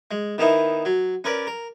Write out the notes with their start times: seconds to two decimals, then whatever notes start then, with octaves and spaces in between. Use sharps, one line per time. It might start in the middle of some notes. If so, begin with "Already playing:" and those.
0.11 G#3
0.38 D#3 A#3 B3 D#4 E4
0.85 F#3
1.24 C#4 A#4 B4 D5
1.47 A#4